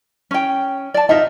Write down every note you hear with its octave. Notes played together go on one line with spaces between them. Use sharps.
C#4 G5
D5 A5
D#4 F4 D#5 E5